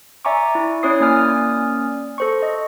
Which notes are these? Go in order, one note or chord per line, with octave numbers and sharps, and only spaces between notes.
D5 E5 G#5 A#5 C#6 D6
E4
C#4 E4 C#5 D5 D#6 C7
A#3 C#4 D5 G#5 D#6 F6
A4 C5 C#6
D#5